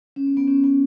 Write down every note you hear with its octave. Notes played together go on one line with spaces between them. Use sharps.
C#4
B3
B3
C#4
B3